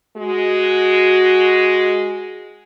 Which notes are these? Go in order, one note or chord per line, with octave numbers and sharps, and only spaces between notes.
G#3 F#4